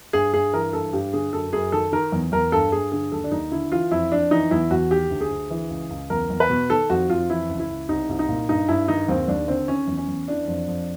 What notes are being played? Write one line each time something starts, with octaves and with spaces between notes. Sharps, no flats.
G2 G#4
G2 G#4
E3 A#4
G2 A4
G2 G4
D3 G#4
F#2 A4
F#2 G#4
D#3 A4
D#3 A#4
E2
E2 A#4
G2 A4
G2 G#4
D3 G#4
D#2 A4
D4
D#2 D#4
D3 E4
E3 F4
F2 E4
F2 D4
E3 D#4
E2 E4
E2 F#4
D#3 G4
D2
G#4
D2
E3
C#2
C#2
E2 A#4
E2
B4
B2
D#3 A4
F2 F#4
F2 F4
E3 E4
C#2
E4
C#2
C2 D#4
C2
D#4
A#2
G2 D#4
G2 E4
D#3 D#4
D#2 C4
D#2 D4
D3 C4
D#3 C#4
E2
C#4
E2
E3 D4
F2
F2